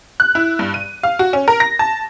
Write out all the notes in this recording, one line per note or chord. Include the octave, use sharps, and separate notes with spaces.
F#6
E4
G2
D#7
F5
F#4
C#4
A#4
A#6
A5